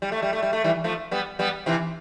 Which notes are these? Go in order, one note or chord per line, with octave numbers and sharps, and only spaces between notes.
G3
A3
G3
A3
G3
A3
E3 G3
F3 A3
G3 B3
G3 B3
C3 E3